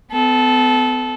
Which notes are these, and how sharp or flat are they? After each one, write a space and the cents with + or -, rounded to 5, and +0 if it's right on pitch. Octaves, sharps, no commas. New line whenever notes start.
B3 +40 A4 -20